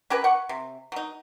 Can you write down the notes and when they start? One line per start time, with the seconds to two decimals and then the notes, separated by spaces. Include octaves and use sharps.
0.10 C#4 G4 A#4 B4
0.24 F#5 C#6
0.49 C3
0.92 F#3 D#4